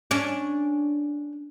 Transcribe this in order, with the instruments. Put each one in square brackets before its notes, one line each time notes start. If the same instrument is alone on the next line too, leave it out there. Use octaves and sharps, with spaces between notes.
[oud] C#4 D4